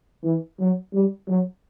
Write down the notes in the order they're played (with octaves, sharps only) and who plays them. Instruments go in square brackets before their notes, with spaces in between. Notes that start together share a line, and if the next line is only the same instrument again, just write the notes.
[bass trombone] E3
F#3
G3
F#3